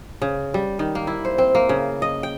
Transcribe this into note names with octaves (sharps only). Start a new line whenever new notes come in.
C#3
G3
D#3
A#3
E4
C5
C4
A#3
C#3
D#5
G5